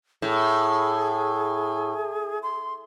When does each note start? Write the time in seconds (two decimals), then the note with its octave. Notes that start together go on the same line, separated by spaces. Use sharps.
0.22 A2 G#4
2.43 C6